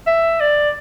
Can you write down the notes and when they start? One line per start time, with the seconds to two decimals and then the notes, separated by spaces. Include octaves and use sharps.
0.07 E5
0.40 D5